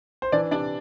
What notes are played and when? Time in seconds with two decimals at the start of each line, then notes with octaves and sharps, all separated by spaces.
0.22 C5
0.32 E3 D4 D5
0.51 C3 D4 D5